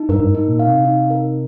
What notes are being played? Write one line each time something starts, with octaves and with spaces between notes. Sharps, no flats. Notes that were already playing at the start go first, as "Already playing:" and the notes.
Already playing: D#4
G2 A#4
G2
G#2
D#4
A#2
F5
C3
D#4
A#4